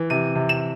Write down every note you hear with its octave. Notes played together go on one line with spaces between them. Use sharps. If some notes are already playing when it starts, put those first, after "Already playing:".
Already playing: E3
C3 D#7
C3
E7